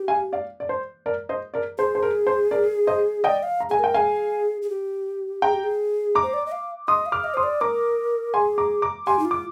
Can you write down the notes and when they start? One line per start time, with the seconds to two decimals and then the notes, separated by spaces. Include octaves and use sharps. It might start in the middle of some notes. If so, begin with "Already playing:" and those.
Already playing: G4
0.08 F5 G#5
0.33 D5 F5
0.60 D5
0.69 C5
1.06 A#4 D5
1.29 C5 D#5
1.54 A#4 D5
1.78 G#4 C5
1.95 C5
2.03 A#4
2.27 C5
2.51 A#4 D5
2.87 C5 D#5
3.24 D5 D#5 G5
3.43 F5
3.60 A#5
3.70 G#4 G#5
3.79 A#4 G5
3.94 G#4 F5 G#5
4.62 G#4
4.69 G4
5.42 G#4 G5 A#5
5.53 G4
5.64 G#4
6.15 A#5 D6
6.23 C5
6.34 D5
6.46 D#5
6.52 F5
6.88 D#5 C6 D#6
7.06 F5
7.12 D6 F6
7.24 D#5
7.34 C5 C6 D#6
7.43 D5
7.61 A#4 A#5 D6
8.34 G#4 G#5 C6
8.58 A#5 D6
8.82 A#5 D6
9.07 G4 G#5 C6
9.19 D#4
9.25 F4
9.31 D6